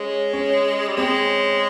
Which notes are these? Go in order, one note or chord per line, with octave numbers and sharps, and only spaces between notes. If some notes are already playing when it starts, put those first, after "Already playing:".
Already playing: G#3 C#4
C#4
G3
G#3 C4